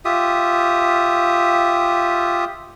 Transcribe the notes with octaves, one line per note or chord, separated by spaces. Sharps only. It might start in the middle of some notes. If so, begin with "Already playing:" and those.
F4 G4 E5 D#6